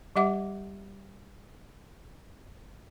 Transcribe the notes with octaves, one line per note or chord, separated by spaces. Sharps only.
G3 G4 E5 F#5 D6